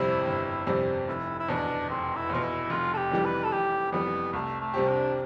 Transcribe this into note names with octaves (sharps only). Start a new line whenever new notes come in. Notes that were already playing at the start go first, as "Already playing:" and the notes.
Already playing: G1 F2 C3 G3 C4 E4
G1
F2 C3 G3 C4
F1 E4
E4
E2 B2 D4
F1 C4
E4
E2 B2 F4
E4
F1 F4
A4
G4
F2 E3 G3
B4
A4
F1 G4
F2 E3 G3 B3
C2 A3
A3
C3 G3 C4 G4
D4